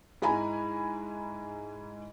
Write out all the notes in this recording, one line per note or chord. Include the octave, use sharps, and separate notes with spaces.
G#2 G#3 E4 G#5 A#5 B5